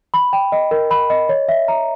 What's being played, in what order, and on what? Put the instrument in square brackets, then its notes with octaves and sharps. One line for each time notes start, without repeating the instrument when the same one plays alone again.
[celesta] B5
G5
D#5
A#4
B5
D#5
C#5
E5
A#5